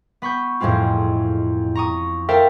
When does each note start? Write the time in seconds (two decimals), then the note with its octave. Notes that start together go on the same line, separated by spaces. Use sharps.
0.22 B3 B5 C#6 G6
0.60 E1 F2 A2 G#3 C4 F4
1.75 A#5 C#6 D#6
2.29 A4 A#4 C5 E5 F5 G5